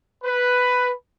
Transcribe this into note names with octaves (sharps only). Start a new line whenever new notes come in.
B4